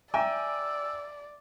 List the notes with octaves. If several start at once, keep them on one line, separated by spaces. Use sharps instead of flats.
D5 E5 G5 G#5 A#5 D6 E6